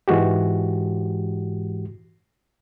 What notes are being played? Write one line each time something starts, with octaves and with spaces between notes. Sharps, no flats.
G#2 E3 G#3 F#4 G4